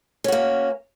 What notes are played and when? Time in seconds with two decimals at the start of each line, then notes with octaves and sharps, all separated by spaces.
0.24 C#4
0.28 F#4
0.32 A#3